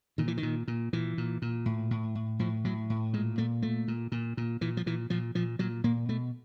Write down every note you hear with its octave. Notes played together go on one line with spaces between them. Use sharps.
A#2 D#3
E3
D#3
A#2
A#2
A#2 E3
A#2
A#2
A2
A2
A2
A2 F3
A2 F#3
A2
A#2 G#3
A#2 A3
A#2 A3
A#2
A#2
A#2
A#2 E3
F3
A#2 E3
A#2 F3
A#2 F3
A#2 F#3
A#2 A#3
B2 A3